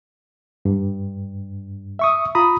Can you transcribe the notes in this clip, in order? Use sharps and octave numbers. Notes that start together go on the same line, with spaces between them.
G2
E5 C#6 D#6
F4 A#5 B5 D#6